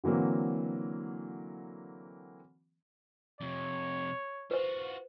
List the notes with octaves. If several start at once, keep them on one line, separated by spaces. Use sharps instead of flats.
D3 E3 F#3 A#3 C4
F2 C3 C#5
F4 F#4 B4 C5